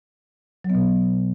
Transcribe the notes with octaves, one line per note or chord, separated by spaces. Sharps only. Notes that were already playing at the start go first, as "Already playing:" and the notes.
F#3
B3
B2